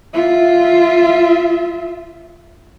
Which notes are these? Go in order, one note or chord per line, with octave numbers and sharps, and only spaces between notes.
F4 E5